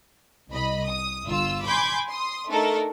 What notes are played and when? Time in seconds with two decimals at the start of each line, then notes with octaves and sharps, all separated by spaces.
0.52 C2 D#5 B5
0.88 D#6
1.27 G1 F4 E6
1.66 G#5 B5 C6 D6 G6 G#6
2.09 C6 D#6
2.49 A3 D4 D#4 A4 A#4